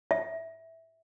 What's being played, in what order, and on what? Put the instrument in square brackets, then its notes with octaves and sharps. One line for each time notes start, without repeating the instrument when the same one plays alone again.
[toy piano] E5